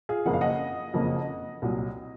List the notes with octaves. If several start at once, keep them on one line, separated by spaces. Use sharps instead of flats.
F4 G#4
F#1 F2 C#3 F3 A#3 F#5
F5
D#5 F#5
F#1 F2 C#3 F3 A#3
C2 A#2 F#3